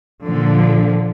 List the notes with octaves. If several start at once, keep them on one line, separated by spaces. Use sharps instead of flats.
A#2 D3 F3